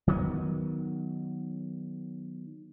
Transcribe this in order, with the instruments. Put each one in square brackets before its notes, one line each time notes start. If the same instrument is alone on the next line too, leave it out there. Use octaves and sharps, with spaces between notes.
[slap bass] D#3 F#3 A3 B3